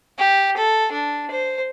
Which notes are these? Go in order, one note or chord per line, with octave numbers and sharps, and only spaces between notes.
G4
A4
D4
C5